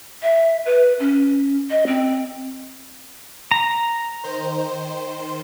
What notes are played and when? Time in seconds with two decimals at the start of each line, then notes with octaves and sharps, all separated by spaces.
0.23 E5
0.66 B4
1.00 C#4
1.71 D#5
1.87 C4
3.51 A#5
4.24 D#3 C5